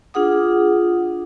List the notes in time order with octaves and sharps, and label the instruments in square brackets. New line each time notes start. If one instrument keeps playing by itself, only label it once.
[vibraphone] D4 F4 G#4 F#5 D#6